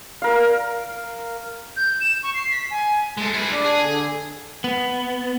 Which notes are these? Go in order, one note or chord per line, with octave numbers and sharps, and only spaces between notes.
A#4 F5
G6
E7
C#6
C7
B6
G#5
G#3 A4
G#4 B4
D4
G#4
D3
B3